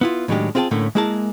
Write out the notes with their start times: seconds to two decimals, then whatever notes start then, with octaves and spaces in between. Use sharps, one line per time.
0.01 B3 E4 F4
0.28 A2 D#3 F#3 G#3 D4 G4
0.55 C4 F4 G#4 B4 G5 A5
0.71 A2 D3 A3 A#3 C#4 E4
0.95 G#3 A#3 E4 G#4 A#4 A5